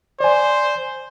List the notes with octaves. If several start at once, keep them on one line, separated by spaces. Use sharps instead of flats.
C5 D5 G#5